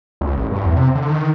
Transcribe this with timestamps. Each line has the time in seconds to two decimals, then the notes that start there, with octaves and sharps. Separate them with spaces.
0.21 C#2
0.37 A1
0.51 G2
0.64 E2
0.76 C3
0.95 D3
1.09 D#3